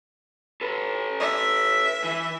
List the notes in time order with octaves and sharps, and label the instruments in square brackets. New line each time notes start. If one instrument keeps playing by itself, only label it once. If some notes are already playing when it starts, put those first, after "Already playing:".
[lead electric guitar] A4 B4
[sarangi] E5
[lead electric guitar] E3